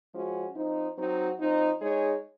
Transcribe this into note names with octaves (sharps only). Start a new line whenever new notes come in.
F3 G#3 C#4 F#4
F3 C4 D#4
F#3 C4 D#4 F#4
F3 C4 D#4
G#3 D#4 G#4 C#5